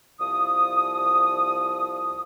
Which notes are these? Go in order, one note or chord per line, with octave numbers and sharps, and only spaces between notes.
C2 F3 D#6